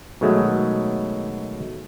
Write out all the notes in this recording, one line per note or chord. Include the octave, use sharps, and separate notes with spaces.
B2 D#3 F#3 G#3 A3